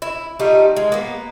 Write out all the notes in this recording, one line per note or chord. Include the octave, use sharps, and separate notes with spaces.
E4
G3 A3 D#4 F4
G#3
A#3 B3